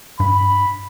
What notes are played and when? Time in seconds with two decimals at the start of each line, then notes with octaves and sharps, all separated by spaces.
0.20 G2 B5